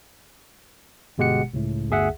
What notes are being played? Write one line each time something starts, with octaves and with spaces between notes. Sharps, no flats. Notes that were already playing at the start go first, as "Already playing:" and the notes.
G1 B2 G#3 G4 F#5 C#7
C#2 A2
G1 D2 G#4 E5 F#5